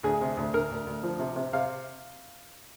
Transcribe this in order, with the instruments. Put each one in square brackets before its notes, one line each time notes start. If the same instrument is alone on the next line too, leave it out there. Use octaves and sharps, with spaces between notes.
[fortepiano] D2 G#4
C3
D2
D2 A#4
D2
D2
F3
C3
C3
C3 F5